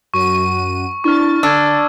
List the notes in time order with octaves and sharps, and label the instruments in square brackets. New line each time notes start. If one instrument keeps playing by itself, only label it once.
[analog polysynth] F#2 F#4 D#7 [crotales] C#6
[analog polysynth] D4 A6 [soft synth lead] E4 [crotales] C#6 F6
[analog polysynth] D3 [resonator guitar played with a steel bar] D4 [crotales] E6 G#6 [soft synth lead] A6